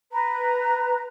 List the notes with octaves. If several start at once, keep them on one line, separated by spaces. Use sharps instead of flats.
B4 A#5